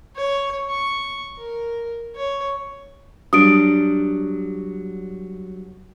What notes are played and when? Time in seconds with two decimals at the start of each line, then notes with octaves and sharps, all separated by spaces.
0.16 C#5
0.69 C#6
1.37 A#4
2.16 C#5
3.33 F#3 G3 D4 D#6 D7